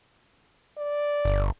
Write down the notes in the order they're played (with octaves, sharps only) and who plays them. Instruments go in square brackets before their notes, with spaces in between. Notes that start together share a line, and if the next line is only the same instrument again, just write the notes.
[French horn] D5
[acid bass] G1